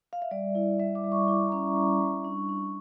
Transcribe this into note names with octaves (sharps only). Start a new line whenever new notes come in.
F5
E5
G3 D5
E4
G3 E5
D6
G3
C#6
E4 D6
A#5
C#4 C#6
G3
G3
D4
D4